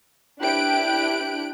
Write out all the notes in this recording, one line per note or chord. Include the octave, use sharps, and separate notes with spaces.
D4 E4 G4 G5 F#6 D7